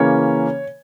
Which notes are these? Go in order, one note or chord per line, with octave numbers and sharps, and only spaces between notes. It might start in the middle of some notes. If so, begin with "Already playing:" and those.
Already playing: C#3 E3 A#3 C#4 C#5